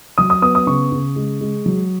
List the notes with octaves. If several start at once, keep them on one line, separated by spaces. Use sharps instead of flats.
F#3 D#6
D#6
B3 D#6
D#6
C#3 C#6
C#3
G#3
G#3
F#3